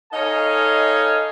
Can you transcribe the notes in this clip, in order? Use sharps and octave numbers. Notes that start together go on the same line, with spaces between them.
D#4 A4 C#5 D#5 F5 G#5